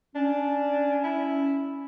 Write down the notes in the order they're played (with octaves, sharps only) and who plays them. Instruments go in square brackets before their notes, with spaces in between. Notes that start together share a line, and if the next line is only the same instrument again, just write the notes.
[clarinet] C#4 [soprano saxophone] D4
[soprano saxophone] E4